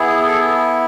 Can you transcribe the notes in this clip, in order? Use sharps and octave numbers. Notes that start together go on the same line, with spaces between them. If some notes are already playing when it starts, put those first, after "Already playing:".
Already playing: B3 E4 G#4
A4